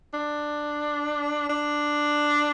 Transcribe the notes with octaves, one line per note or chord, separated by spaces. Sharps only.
D4
D4